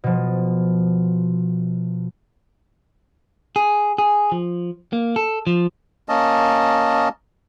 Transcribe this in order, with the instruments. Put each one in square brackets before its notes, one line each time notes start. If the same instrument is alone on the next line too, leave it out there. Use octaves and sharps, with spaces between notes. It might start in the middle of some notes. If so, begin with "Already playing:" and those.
[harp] B2 F3
[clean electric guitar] G#4
G#4
F3
A#3
A4
F3
[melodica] A#3 C#4 D#5 A5